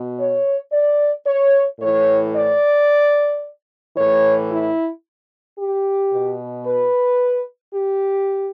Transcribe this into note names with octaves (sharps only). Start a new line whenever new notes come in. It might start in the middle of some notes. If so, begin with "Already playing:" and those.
Already playing: B2
C#5
D5
C#5
A2 E3 C#5
D5
A2 E3 C#5
E4
G4
B2
B4
G4